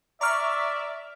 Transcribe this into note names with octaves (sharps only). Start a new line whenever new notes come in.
D5 E5 A#5 C#6 F6